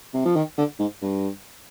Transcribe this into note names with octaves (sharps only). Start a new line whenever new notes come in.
C3
F3
D#3
D3
G#2
G2